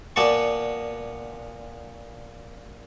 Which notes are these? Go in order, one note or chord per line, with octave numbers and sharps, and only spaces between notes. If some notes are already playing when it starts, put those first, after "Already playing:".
A#2 B3 D5 A5 C#6